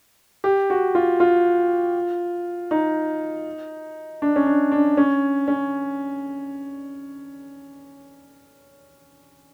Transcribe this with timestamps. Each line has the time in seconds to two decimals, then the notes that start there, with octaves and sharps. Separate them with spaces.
0.44 G4
0.70 F#4
0.95 F4
1.20 F4
2.71 D#4
4.22 D4
4.36 C#4
4.46 D4
4.72 D4
4.97 C#4
5.48 C#4